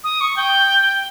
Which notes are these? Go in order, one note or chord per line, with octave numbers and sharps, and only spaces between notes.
D#6
C#6
G5